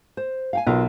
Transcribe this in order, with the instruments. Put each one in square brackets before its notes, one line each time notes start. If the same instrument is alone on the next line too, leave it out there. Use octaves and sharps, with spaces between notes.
[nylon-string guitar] C5
F5 G5 G#5
[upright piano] B1 [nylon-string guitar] F4 A#4 B4